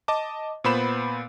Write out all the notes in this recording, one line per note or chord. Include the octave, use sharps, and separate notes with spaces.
D#5 A5 D6
A#2 B3 C5 B5 E7